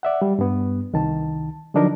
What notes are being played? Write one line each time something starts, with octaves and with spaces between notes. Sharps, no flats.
D5 E5 F#5
G3
G2 B3
C2 D#3 A5
D3 F3 F#3 D4 D#4 A#4